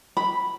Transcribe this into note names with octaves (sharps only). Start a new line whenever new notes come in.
B5